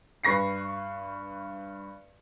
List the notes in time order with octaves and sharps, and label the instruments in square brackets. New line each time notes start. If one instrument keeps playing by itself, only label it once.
[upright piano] G2 B4 C#6 A#6 C7